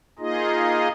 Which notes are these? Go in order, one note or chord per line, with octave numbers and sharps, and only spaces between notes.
A#3 D#4 F4 G#4 D#5